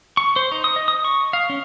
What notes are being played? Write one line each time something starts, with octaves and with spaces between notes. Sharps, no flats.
C#6
C5
D#4
D#6
D#5
D#6
C#6
F5
C#4